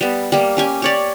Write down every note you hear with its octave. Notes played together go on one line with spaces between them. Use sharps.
G3 B3
G3 A#3
C#4 G4 G#5
G4 C#5 D5